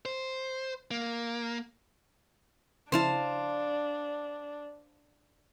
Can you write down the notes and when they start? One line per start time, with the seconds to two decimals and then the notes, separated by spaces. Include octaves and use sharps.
0.05 C5
0.91 A#3
2.92 C#3 F3 D4 E4 C5 F5 A5